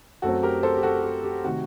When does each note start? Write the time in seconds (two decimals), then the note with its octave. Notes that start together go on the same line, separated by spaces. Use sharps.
0.22 F#2 F#3 A3 C4 F#4 A4
0.43 G4 A#4
0.63 A4 C5
0.77 G4
0.83 F#4 A4
1.03 G4
1.24 G4
1.44 C3 D#3 A3 F#4